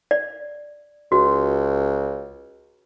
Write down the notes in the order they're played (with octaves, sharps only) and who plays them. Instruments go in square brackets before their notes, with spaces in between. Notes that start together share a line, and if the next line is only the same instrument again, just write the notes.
[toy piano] D5
[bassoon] C#2 [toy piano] F#4